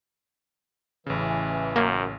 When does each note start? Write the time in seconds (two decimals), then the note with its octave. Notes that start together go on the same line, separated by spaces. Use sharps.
1.06 A1 C#3 E3
1.76 F#2 A#3